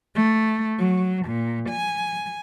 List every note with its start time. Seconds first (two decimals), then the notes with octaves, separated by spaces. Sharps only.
0.15 A3
0.79 F#3
1.27 A#2
1.70 G#5